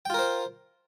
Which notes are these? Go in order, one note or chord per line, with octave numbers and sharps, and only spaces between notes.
F4 A#4 C5 G5